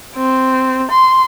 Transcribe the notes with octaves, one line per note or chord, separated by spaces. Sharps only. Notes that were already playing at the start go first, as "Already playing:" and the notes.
C4
C6